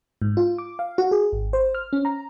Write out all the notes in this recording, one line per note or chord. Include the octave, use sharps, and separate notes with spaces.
G#2
F4
D6
F5
F#4
G#4
G#1
C5
F6
C#4
A#5